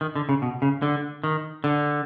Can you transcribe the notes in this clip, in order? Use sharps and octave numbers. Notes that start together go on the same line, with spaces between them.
D#3
D3
C#3
B2
C#3
D3
D#3
D3